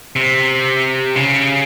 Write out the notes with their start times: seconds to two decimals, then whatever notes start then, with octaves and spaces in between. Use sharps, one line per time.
0.16 C3
1.16 C#3